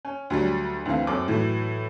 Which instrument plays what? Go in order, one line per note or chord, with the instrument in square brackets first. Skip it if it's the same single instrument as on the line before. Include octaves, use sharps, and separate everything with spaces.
[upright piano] C#4
D2 F#3 G3
D2 E3 C4 F5
F#2 C4 A4 D6
A2 E3 F#3